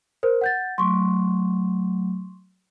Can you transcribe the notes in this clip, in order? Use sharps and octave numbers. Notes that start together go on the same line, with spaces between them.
A#4 C5
F#5 G6 A6
F#3 A3 C6 C#6